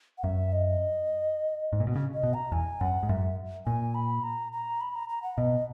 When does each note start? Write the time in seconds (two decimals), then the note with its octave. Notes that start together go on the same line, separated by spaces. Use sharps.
0.18 F#5
0.24 F#2 E5
0.52 D#5
1.73 G#2
1.80 A#2
1.87 B2
1.96 C#3
2.14 D#5
2.23 B2
2.34 A#5
2.52 E2 G#5
2.81 F#2 F#5
3.03 G#2
3.09 F#2 E5
3.66 A#2 G#5
3.95 B5
4.23 A#5
4.52 A#5
4.81 B5
4.95 A#5
5.09 A#5
5.23 F#5
5.38 B2 D#5